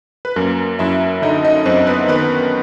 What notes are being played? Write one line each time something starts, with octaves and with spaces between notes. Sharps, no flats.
B4
F#2 A#3 A#4
F#2 E4 E5
D3 D#4 D#5
D#4 D#5
F#2 C4 C5
B3 B4
D#3 B3 B4